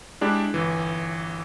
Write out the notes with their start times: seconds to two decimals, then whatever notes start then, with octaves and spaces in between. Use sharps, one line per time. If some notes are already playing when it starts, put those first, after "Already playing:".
0.21 G#3 D4 E4 G4
0.54 G1 E3